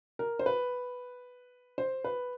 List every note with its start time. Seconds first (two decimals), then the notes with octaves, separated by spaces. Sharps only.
0.19 A#4
0.39 C5
0.46 B4
1.78 C5
2.04 B4